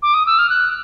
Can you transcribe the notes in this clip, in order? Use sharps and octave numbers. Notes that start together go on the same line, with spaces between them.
D6
D#6
E6
F6
F#6